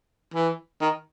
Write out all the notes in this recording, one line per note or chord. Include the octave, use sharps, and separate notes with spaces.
E3
D#3